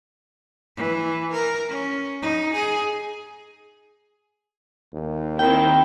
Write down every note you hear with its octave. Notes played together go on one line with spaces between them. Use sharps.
E3
A#4
C#4
D#4
G#4
D#2
D#3 C4 E4 G5